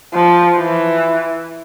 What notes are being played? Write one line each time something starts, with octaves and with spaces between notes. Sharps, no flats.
F3
E3